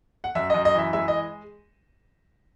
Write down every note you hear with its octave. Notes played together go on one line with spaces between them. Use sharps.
F#5
F#2 E5
F#2 D#5
D#5
E3 E5
G#3 E5
D#5